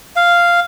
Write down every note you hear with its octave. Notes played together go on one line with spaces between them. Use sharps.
F5